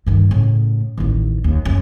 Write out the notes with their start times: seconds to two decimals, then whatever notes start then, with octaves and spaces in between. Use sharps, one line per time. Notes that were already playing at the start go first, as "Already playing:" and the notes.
0.06 G2 D#3
0.31 A2 C#3
0.98 A1 D#2
1.44 D#2
1.65 F#2